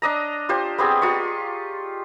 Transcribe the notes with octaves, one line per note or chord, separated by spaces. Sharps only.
D4 D#5 A#5
F4 G4 C5
B3 C4 G4 G#4
F4 A#5 C#6